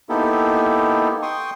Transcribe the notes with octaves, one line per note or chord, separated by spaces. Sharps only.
A#3 B3 D#4 E4 G4 A4
G5 C6 C#6 D#6